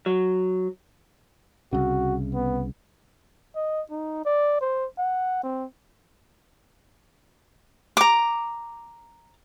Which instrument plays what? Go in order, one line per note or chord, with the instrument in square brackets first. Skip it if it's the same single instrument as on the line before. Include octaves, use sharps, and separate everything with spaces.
[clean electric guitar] F#3
[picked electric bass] C2 C#3 [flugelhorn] F#4
[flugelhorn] B3
D#5
D#4
D5
C5
F#5
C4
[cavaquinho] A#5 D6